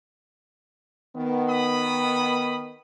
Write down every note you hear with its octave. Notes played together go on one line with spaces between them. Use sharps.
D#3 B3
B5 D#6